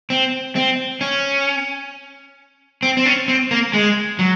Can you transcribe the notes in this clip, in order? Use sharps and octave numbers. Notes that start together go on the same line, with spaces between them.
C4
C4
C#4
C4
C4
C#4
C4
A#3
G#3
F#3